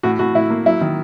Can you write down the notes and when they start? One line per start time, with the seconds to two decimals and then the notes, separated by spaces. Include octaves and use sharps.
0.03 A2 F#4
0.19 A2 F#4
0.35 A2 E4
0.50 A#3
0.66 F#3 E4
0.81 D#3